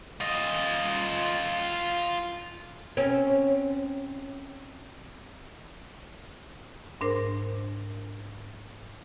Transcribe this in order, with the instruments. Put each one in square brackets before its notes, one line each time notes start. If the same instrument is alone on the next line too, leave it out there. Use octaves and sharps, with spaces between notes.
[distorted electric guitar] F4 D#5
[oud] C4 C#4
[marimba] G#2 D4 A#4 C5